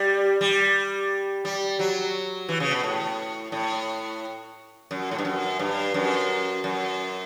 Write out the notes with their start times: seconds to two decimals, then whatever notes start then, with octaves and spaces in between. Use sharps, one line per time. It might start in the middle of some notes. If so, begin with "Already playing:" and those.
Already playing: G3
0.41 G3
1.45 G3
1.79 F#3
2.49 E3
2.60 C#3
2.71 B2
2.83 A2
3.52 A2
4.91 F#2
5.11 A2
5.18 G2
5.25 F#2
5.59 G2
5.94 F#2
6.64 F#2